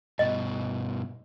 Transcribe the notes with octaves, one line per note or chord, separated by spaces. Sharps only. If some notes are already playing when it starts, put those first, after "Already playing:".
G2 B2 D#5